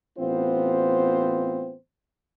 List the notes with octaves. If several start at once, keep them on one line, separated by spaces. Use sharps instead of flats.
A1 B3 C4 F4 C5